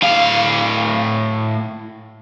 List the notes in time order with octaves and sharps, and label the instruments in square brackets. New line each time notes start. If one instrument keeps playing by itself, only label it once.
[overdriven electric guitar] A2 F5